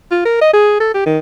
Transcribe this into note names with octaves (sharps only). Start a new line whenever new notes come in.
F4
A#4
D#5
G#4
A4
G4
D#3